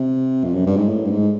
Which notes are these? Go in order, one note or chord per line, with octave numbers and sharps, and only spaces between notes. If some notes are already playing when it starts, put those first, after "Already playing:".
Already playing: C3
F2
F#2
G2
G#2
A2
G2
G#2